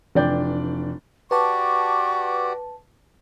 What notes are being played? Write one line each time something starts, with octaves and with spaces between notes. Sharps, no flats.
F1 E3 D4 D5 G5 G6
F#4 G4 B4 D5 A5 C#6